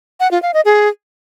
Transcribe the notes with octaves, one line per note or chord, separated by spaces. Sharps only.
F#5
F4
F5
D#5
G#4